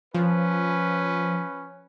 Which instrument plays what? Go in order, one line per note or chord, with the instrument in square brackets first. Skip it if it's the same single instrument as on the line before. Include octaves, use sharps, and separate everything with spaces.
[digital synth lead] F3 [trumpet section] C#4 B4